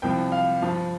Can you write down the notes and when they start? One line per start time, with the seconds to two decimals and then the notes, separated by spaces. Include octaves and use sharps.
0.02 C2 C3 F3 G5
0.32 F5
0.62 G2 F3